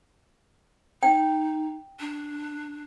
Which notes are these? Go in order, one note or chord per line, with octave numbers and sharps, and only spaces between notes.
D#4 G5
D4